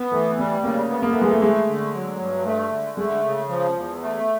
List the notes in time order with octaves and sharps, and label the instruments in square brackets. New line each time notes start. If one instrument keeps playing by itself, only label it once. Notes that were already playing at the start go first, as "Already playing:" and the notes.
Already playing: [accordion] B3
[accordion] E3 [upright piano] A3
[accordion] G3 [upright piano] B3
[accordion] C#3 [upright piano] A#3
[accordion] B3
[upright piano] A#3
[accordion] E3 [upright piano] A3
[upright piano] G#3
A3
[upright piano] G#3 [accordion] A3
[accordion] D3
F#3
G2
A3
D3
[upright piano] G#3 [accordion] A3
[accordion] C#3
F3
E2
A3